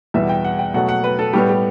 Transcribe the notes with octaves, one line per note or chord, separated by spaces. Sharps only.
E2 B2 G3 B3 E5
G5
F#5
G5
B2 F#3 A3 F#5
F#5
B4
A4
A2 G3 B3 G4
G4